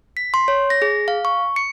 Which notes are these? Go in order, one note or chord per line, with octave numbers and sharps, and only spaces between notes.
B6
C6
C#5
A#6
G#4
F5
C#6
C#7